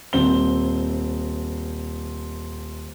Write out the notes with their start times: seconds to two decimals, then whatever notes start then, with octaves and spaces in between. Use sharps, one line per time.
0.13 D#1 C4 G7